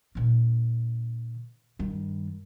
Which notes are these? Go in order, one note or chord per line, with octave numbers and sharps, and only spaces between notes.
A#2 D3
G2 D#3